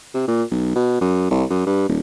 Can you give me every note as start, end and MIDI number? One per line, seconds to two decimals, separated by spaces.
0.14 0.23 48
0.28 0.43 46
0.51 0.74 35
0.75 0.98 47
1.01 1.27 42
1.30 1.44 36
1.50 1.63 42
1.66 1.88 43
1.88 2.00 27